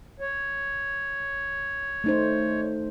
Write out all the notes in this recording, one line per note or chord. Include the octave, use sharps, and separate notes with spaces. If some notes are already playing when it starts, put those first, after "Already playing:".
C#5
A3 D#4 C5